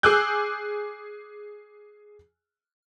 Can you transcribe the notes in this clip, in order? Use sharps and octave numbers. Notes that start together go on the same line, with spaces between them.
G#4 G#5 D6 E6 F#6 G6